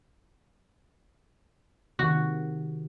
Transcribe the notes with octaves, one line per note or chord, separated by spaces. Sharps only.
C3 D#3 F#4